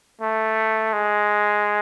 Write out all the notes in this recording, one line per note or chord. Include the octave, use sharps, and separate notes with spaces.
A3
G#3